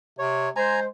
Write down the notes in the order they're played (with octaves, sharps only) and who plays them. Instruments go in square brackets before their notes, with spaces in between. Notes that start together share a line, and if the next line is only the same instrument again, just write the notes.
[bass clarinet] C3 [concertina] C#5
[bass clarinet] G#3 [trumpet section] C5 [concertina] G#5 A#5